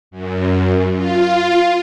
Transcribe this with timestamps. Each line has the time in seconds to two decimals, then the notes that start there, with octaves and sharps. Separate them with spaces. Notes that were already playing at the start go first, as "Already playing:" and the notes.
0.11 F#2
0.95 F4